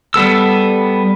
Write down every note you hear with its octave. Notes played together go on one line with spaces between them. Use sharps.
G3 B3 A4 E6